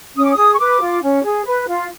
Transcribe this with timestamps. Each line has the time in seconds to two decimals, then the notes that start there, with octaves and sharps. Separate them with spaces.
0.16 C#4 D#6
0.24 D6
0.32 D#6
0.37 G#4
0.53 C#6
0.59 B4 D6
0.81 F4
1.02 C#4
1.24 G#4
1.45 B4
1.67 F4